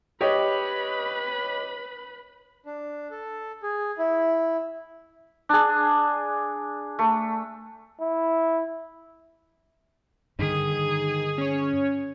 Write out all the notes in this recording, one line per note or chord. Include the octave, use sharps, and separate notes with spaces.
G4 B4 C#5 D#5 B5
D4
A4
G#4
E4
D4 G#4
A3
E4
G2 D3 D#3 G#4 D#6
C#4 C#5